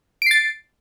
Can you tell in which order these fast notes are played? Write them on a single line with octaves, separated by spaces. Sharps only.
D7 C7 A6